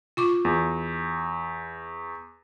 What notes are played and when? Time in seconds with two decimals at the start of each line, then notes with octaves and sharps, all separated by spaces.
0.17 F4 C#6 D6
0.45 E2